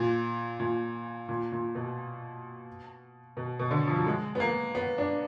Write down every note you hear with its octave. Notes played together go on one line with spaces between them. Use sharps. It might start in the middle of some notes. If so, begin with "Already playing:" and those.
Already playing: A#2
A#2
A#2
A#2
B2
B2
B2
D3
F3
F#3
G#3
B3
A#3
B3
D4